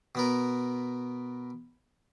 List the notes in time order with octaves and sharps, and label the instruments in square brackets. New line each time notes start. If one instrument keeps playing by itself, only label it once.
[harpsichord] B2 B3 A#4